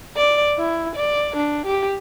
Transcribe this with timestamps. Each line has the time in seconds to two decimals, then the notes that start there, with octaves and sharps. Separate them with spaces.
0.17 D5
0.58 E4
0.96 D5
1.37 D4
1.66 G4